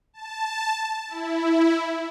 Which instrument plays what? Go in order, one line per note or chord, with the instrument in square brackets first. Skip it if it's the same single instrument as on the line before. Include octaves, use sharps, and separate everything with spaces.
[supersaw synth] A5
E4